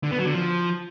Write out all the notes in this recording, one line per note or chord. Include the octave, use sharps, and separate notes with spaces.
D3
B3
F#3
D3
F3